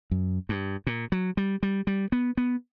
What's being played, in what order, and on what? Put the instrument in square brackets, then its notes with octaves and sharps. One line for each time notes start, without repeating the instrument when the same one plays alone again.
[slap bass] F#2
G2
A#2
F#3
G3
G3
G3
B3
B3